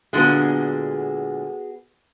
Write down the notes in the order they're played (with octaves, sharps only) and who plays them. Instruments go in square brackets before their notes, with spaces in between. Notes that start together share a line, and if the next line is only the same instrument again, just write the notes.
[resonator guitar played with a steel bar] A#2 D3 G#3 [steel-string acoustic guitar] B3 F#4 G#4